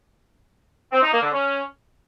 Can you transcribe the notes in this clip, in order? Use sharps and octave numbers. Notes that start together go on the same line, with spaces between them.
C4
D#4
A#3
D3
C#4